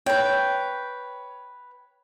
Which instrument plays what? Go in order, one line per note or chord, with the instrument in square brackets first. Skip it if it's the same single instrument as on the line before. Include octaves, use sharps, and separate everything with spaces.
[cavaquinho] B4 G5 [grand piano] C#5